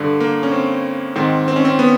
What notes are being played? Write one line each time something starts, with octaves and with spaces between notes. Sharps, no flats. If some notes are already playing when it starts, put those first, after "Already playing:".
Already playing: G2 D3
A#3
C#4
C4
G#2 D#3 C4
C4
C#4
C4
B3